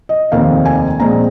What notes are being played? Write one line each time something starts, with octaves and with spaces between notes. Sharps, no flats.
D#5
F1 D#2 D#3 C4 F5
G#5
A#1 A#2 G#3 C4 A#5